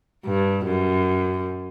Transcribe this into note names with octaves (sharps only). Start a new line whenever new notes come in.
G2
F#2